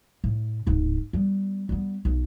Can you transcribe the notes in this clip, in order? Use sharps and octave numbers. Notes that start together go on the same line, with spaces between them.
A2
D1 G#2
G3 B3
G3 B3
B1